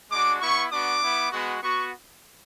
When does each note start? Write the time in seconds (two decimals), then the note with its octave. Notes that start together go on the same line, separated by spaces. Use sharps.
0.11 G#3 D4 F#4 D6
0.41 B3 E4 C#6
0.72 B3 D4 F#4 D6
1.02 B3 E4
1.32 G#3 B3 F#4
1.62 B3 F#4 C#6